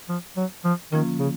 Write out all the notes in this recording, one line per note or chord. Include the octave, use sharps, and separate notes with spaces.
F3
F#3
F3
D3 D#3 F3 A#3 C#4 F4
C#3